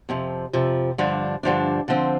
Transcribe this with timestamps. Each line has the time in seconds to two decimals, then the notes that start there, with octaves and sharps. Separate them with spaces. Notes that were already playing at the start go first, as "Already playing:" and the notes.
0.09 F2 C3 F3
0.53 F2 C3 F3
0.98 G2 D3 F3 D4
1.43 G2 D3 F3 D4
1.88 D3 F3 C4